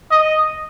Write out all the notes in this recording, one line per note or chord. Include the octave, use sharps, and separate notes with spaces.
D#5